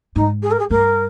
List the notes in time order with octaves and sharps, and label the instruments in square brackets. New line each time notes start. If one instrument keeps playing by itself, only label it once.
[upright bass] G#2 [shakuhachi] D#4
[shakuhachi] G#4
A#4
G#4
[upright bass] G2 [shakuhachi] A#4